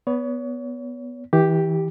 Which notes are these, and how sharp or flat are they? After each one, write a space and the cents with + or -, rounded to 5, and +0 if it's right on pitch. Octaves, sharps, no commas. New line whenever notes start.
B3 +0 C#5 +35
E3 -30 G4 +0